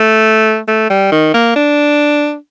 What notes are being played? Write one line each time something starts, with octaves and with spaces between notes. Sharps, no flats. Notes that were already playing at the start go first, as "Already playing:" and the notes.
Already playing: A3
A3
G3
D#3
A#3
D4